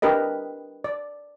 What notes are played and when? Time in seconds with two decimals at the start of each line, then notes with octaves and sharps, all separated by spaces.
0.02 D4 G4 A#4 B4 D#5
0.84 D5